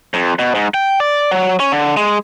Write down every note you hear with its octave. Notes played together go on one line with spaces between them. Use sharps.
F2
B2
G#2
G5
D5
F#3
C#4
D3
G#3